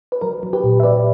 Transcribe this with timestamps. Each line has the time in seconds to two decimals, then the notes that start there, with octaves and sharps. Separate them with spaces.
0.12 B4
0.21 F#3 A#4
0.43 F#3
0.53 G4 B4
0.64 A#2
0.80 E5
0.83 F#3 B4 D5